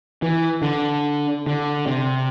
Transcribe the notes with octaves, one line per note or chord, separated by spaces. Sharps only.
E3
D3
D3
C3